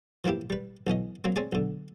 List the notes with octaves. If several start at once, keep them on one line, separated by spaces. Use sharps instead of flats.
E3 F3 A#3 E4 G4
G3 B4
B1 E3 C#4 D#5
F#3 A#3 C4
C4 C#4 G#4 D5
B1 D3